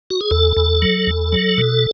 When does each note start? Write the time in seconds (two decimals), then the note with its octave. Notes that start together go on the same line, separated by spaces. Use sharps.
0.10 F#4
0.21 G#4
0.31 E2 A4
0.57 E2
0.82 F#3
1.07 E2
1.32 F#3
1.58 B2